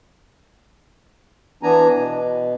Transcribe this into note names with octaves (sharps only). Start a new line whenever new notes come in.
E3 B3 D4 G#5 A#5
B2